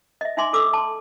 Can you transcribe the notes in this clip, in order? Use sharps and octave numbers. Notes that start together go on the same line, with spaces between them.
D#5 E5
D#4 E5 G#5 C6 D6
A4 D5 D6 E6
A5 C6